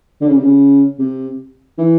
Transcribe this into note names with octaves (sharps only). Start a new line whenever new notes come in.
D3
C#3
C3
C#3
C3
E3